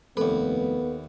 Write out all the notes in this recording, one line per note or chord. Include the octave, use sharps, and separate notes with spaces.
F1 D#2 B3 A4 B4